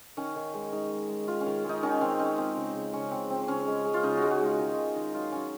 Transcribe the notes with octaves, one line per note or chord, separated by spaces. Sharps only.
D#3 C#4
D#3
G#3
G#3 D#4
G#3
G#3
D#3 F4
C#4
D#3
G#3 D#4
D#3 C#4
D#3 C4
G#3 C#4
F3 C4
C#3
C#3
C#3 C#4
C#3 C4
F3 C4
C#3 C#4
G#3
G#3
F4
C#3 D#4
G#3 F#4
F#4
G#3 F4
D#3 D#4
D#3
D#3
F#3 F4
F#3 C#4